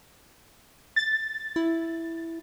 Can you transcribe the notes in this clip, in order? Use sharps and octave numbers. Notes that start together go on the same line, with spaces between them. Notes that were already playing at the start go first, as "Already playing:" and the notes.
A6
E4